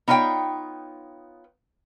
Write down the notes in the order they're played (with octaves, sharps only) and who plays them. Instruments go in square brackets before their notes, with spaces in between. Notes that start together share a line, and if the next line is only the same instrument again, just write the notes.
[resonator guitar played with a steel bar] B3 D#4 F4 C#5 G5